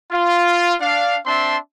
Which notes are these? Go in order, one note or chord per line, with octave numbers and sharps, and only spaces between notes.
F4
D4 F5
C4 D4 E5 A5 C6